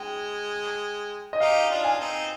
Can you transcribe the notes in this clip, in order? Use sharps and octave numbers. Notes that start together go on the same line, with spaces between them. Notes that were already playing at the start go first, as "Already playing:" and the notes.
Already playing: G#3 G5
D#5
D#4 G4 F5
D4 F4
G#5
C4 D#4